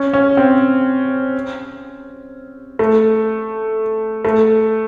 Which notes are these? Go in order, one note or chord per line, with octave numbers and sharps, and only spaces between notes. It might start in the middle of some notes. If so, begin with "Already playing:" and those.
Already playing: C#4
C#4
C4
A3
A3